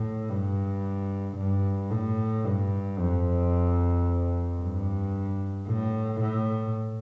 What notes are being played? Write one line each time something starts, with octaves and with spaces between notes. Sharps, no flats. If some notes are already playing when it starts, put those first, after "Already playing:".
Already playing: A2
G2
G2
A2
G2
F2
G2
A2
A2